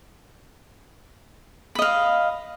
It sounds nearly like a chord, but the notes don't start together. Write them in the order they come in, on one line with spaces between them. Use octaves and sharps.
B5 D#5 F5